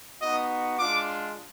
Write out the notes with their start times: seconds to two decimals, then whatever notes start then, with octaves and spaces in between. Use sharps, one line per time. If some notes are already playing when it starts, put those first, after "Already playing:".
0.21 B3 D#4 F#4 D#5
0.79 G#3 D4 F4 D6